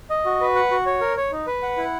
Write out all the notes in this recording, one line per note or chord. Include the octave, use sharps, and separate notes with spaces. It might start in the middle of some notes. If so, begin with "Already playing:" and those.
D#5
F#4
B4
F#5
F#4
C#5
A#4
C#5
D#4
B4
F#5
E4